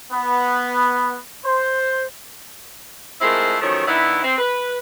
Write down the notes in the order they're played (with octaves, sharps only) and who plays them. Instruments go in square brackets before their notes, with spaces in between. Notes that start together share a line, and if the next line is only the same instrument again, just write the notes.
[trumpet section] B3
C5
[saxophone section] G#3 A3 C4 E4 F4 A#4
F#2 D#3 F3 A3 C#5
D#3 B3 D4 E4
C4
B4